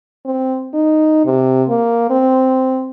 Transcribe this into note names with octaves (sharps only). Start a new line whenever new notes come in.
C4
D#4
C3
A#3
C4